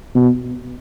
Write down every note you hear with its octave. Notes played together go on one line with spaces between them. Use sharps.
B2